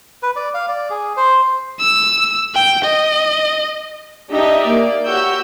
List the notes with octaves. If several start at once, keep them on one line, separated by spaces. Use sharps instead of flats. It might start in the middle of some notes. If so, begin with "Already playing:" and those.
B4
D5
F5
D5
G#4
C5
E6
G5
D#5
D4 D#4 G4 D#5 E5
A#3 D5
F#4 G4 C#5 F#5 E6 G6